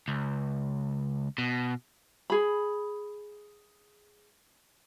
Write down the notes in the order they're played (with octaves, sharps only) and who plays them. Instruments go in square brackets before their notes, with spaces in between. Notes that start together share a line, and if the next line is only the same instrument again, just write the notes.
[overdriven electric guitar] C#2
B2
[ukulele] G#4 B5